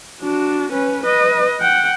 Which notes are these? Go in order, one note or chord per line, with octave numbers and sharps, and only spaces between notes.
D4 F#4
C#4 B4
B4 D#5
F#5 G5